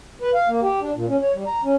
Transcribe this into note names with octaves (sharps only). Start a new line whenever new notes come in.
B4
F5
A#3
G4
D4
A#2
C#4
C#5
G3
A#5
C#4